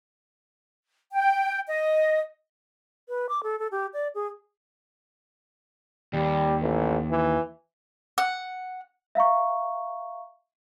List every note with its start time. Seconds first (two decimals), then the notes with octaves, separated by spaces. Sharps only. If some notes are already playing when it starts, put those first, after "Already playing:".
1.13 G5
1.67 D#5
3.09 B4
3.29 D6
3.43 A4
3.59 A4
3.71 G4
3.94 D5
4.15 G#4
6.14 D#2 G3
6.61 A1
7.10 E3
8.18 F#5
9.15 E5 F5 A#5 C#6